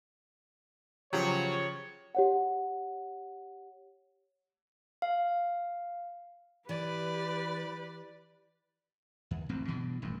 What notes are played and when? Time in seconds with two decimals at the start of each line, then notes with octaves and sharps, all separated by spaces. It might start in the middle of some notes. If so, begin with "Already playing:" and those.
1.13 C#3 F3 F#3 G4 C#5
2.15 G4 C#5 F#5
5.02 F5
6.69 E3 G4 B4 D5
9.31 D#2
9.49 D1 A1 F2 C4
9.68 G2 B2 E3
10.02 D#1 A1 F#2